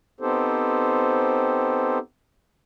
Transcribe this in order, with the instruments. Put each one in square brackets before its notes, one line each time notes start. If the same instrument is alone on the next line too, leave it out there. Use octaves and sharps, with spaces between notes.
[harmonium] B3 C4 D#4 G4 A4 C5